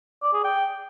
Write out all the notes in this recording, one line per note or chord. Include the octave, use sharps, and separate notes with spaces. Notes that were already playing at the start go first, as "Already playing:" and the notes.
D5
G#4
G5